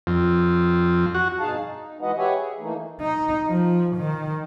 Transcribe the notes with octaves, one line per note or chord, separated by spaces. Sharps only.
F2
F#4
G2 B2 D#4 G#4 F5 A5
D#4
E3 G#3 F#4 B4 D#5 F#5
G4 B4 C#5 E5 F#5 G#5
G#4
E3 A3 A#3 D#4
D#4
F3
D#3